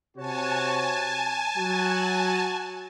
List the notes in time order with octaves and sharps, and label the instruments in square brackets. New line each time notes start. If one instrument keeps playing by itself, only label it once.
[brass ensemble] C3 F#4 C#5 [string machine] G#5 A5
[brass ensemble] F#3 F#4